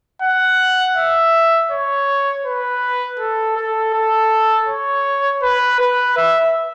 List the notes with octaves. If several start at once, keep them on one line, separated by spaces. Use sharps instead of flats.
F#5
E5
C#5
B4
A4
A4
A4
C#5
B4
B4
E5